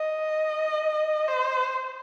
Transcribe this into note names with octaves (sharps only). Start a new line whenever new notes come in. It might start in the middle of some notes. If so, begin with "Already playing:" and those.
Already playing: D#5
C5